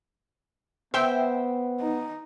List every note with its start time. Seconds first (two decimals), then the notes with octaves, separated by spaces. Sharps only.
0.94 B3 C5 E5 G5 E6
1.80 D#4